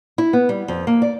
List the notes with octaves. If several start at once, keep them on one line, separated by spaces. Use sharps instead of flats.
E4
B3
G3
F2
A#3
D5